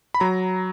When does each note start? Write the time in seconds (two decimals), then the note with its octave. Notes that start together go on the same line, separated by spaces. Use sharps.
0.14 B5
0.20 F#3 A#5